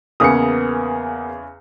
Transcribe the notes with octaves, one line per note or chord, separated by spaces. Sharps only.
E2 C#3 A#3 B3 D#6 C#7